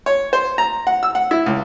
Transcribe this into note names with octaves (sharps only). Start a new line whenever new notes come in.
C#5
C5
A#5
F#5
E6
F#5
E4
C#2